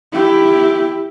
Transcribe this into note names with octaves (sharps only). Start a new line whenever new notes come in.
E4 G4